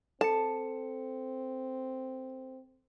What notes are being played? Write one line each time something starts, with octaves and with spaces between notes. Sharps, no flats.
C4 A4 A5 C#7